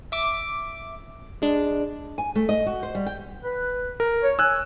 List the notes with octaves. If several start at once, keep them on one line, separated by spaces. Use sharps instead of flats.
E5 D6
G#3 D4
G#5
A3
D#5
F#4
C5
G3
G5
B4
A#4
C#5
G#5 E6 F#6